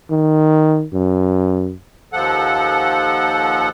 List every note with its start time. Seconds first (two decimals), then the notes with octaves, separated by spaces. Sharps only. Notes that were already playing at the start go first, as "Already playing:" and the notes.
0.10 D#3
0.93 F#2
2.13 D#2 F3 A4 F#5